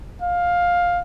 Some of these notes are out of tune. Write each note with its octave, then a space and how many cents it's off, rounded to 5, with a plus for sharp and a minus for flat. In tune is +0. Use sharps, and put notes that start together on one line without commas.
F5 +10